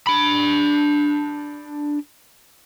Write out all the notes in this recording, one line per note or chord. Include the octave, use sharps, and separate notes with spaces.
D4 B5